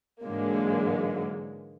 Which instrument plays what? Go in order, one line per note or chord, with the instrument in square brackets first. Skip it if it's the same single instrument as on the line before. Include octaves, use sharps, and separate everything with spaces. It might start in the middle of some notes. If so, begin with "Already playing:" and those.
[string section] G#2 D3 E3 F#3 G#3 A#3